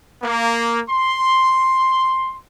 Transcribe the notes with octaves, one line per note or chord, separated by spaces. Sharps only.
A#3
C6